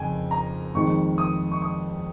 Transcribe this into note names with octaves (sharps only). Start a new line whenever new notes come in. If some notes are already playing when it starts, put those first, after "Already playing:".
Already playing: F2 C#3 G5 G#5
A#5
F2 D#3 G#3 C#6
D#6
C#6
D#6